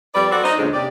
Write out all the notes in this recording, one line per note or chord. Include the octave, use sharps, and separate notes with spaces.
F2 G3 B4 D5
F#3 F#4 A4 C5 D5
D#4 C5 D#5
E2 A#2 D3 G#3 C#4 D4
C3 G4 D5